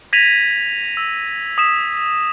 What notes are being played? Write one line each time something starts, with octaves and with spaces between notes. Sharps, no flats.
G#6 A#6 B6 D#7 F7 F#7
E6
D#6 B6 E7